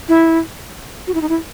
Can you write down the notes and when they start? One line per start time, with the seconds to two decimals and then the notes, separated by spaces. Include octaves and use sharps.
0.09 E4
1.07 F#4
1.14 E4
1.22 D#4
1.29 E4